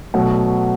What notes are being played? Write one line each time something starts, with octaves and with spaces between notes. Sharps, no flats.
B2 F#3 A3 F#4